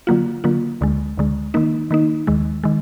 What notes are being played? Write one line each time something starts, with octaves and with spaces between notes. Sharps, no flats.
D3 F#3 A#3 F4
D3 F#3 A#3 F4
D2 D3 G#3
D2 D3 G#3
D#3 A#3 D#4
D#3 A#3 D#4
D#2 D#3 G#3
D#3 G#3